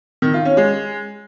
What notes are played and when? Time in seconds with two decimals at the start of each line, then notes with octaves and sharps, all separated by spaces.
0.22 D#3
0.34 F4
0.45 C#4
0.57 G#3